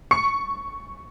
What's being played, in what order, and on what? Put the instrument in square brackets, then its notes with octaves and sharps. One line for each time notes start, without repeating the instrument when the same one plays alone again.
[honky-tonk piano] C#6 C#7